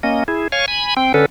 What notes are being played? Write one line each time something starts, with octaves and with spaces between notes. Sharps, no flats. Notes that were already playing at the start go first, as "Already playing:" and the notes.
A#3 C#4 D#5
E4 G#4
C#5 F5 G#5 C#6
G#5 B5
C4 G5
D3 C#4 A4 B4